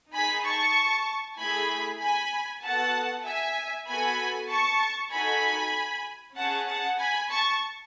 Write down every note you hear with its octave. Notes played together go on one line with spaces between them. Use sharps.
D#4 G#4 G#5 B5
A5 C#6
A3 E4 G#4 G#5 B5
G#5 B5
B3 F#4 A4 F#5 A5
E5 G#5
B3 F#4 A4 G#5 B5
A5 C#6
D#4 F#4 A4 G#5 B5
C#4 G#4 F#5 A5
F#5 A5
G#5 B5
A5 C#6